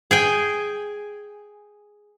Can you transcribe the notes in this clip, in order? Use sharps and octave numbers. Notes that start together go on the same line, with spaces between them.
G#4 G5 G#5